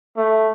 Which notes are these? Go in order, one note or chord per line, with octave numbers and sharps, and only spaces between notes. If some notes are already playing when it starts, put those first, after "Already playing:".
A3